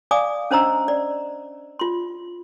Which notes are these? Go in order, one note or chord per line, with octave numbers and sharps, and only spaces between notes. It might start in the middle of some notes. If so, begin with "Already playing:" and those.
D5 F5 G#5 D6 D#6
C#4 D4 C5 D#5 A#5 E6
D5
F4 C6